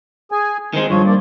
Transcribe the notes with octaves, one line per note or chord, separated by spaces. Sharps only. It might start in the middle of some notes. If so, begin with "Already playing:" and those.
G#4 G#5
D#3 G#3 C4
G2 F3 F4 C#5
A#3 D5